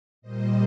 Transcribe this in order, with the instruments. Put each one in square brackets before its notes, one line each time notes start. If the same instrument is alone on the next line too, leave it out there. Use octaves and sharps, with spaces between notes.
[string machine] A#2 G3 A#3 C5 D#5